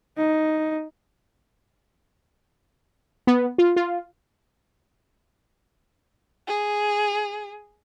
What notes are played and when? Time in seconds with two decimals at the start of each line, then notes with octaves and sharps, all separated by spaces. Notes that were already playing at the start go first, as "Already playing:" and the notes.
0.17 D#4
3.27 B3
3.58 F4
3.76 F4
6.48 G#4